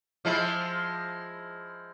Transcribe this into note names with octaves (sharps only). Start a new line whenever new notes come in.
F3 G#3 E4